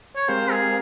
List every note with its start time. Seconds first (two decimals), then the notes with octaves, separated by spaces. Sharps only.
0.16 C#5
0.28 G#3 C4 G4 A#4 C5 F5
0.51 G#4